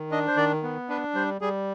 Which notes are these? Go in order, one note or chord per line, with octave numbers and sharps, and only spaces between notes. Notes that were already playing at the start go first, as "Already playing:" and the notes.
Already playing: D#3
D4 D#5
C5
D#3 D5
B3
D4 B4
G3 C5
G3 G#4